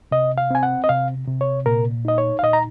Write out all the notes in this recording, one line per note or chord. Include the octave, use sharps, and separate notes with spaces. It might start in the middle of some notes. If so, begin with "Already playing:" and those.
C3 D#5
F5
C4 G#5
F#5
D#5
C3 F5
C3
C#5
A#2 A#4
D#4 D#5
C#5
F5
A#2 D#5
A#5